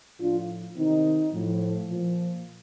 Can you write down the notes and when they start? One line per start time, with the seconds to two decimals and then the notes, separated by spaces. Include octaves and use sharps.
0.20 A2 F3 D4 F4
0.76 C3 D#3 C4 D#4
1.33 A2 F3
1.88 A#2 F3